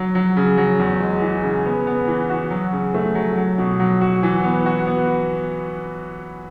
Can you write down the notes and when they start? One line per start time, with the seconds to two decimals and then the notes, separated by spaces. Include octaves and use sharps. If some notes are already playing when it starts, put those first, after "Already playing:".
Already playing: F#3
0.15 F#3
0.37 C#3
0.57 F#3
0.79 E2
1.00 G#3
1.22 E3
1.43 C#3
1.66 B3
1.87 B3
2.08 E3
2.30 F#4
2.50 F#3
2.72 C#3
2.94 A3
3.15 F#3
3.37 F#3
3.58 B2
3.79 F#3
4.01 F#4
4.23 E3
4.44 B3
4.66 F#4
4.87 B3